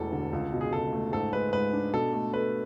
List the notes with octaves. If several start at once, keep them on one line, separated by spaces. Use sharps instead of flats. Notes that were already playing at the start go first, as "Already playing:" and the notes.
Already playing: E1 E2 F#3 A3 A4
D3
C#2
B2
G#4
C#2 A4
A3
G#2 A4
G#3 B4
G#2 B4
D4
B2 A4
A3
A4 B4